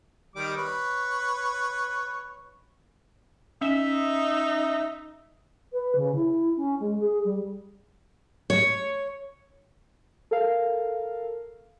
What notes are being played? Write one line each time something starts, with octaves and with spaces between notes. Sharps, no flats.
D#3 G3 D6
B4 C#5
C#4 D#4 E5
B4
C#3
E4
C#4
G#3
G#4
G3
C#5
A4 A#4 F5